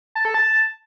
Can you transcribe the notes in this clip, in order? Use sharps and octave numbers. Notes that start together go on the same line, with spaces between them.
A5
A4
A5